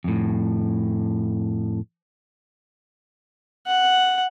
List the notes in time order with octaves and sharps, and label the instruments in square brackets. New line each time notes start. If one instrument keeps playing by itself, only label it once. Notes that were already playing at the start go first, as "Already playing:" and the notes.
[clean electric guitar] F2 A2
[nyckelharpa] F#5